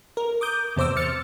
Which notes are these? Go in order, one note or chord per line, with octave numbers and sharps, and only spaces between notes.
A#4
D6 D#6 G6
E2 C3 C5 D6 E6
F6 A6 C#7